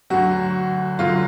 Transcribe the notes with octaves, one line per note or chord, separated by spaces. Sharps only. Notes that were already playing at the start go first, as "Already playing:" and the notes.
D2 D3 F#3 F#4
D2 D3 F#3 F4